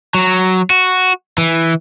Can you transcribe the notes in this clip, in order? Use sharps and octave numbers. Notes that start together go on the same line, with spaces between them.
F#3
F#4
E3